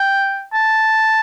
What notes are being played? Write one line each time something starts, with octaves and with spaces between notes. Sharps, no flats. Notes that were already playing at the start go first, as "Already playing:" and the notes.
Already playing: G5
A5